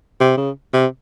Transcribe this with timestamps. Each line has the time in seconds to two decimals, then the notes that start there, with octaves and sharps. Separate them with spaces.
0.20 C3
0.37 C#3
0.73 C3